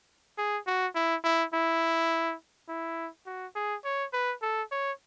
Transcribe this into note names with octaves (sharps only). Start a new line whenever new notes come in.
G#4
F#4
E4
E4
E4
E4
F#4
G#4
C#5
B4
A4
C#5